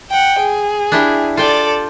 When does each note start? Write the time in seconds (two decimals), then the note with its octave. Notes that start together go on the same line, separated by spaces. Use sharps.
0.10 F#5 G5
0.40 G#4
0.92 D4 E4 G4
1.37 F4 A4 D5 G5